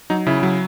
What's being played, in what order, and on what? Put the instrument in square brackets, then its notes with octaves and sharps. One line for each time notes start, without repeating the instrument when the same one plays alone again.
[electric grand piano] F#3 D#4
C#3 E4
F#3